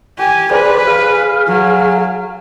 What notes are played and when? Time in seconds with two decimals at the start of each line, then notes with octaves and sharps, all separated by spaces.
0.18 G4 G#5
0.51 G#4 B4 C5 D5
0.87 G#4 F5
1.47 F#3